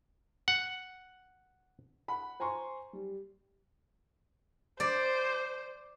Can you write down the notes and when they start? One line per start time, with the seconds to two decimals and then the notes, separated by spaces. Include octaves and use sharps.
0.48 F#5
2.08 F#5 B5
2.40 C5 G#5 A#5 C6 C#6
2.93 G3
4.80 C5 D5